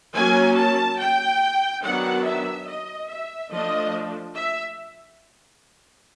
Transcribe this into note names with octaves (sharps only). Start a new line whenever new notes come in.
F#3 A#3 C#4 G#5
A5
G5
D#3 F#3 B3 D4 F#5
E5
D#5
E5
F3 A3 D4 D#5
E5